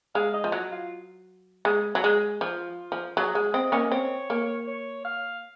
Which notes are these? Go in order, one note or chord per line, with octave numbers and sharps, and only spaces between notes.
G#3 F5
D#5
F3
F#3
F4
G#3
F#3
G#3
F3 F4
F3
F#3 G#4
G#3
C4 D#5
A#3 C#4
C4 C#5
A#3
C#5
F5